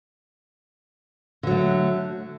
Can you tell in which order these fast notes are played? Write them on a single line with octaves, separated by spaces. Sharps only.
D3 F#3 A3